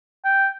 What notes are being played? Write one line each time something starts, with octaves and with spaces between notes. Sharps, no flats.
G5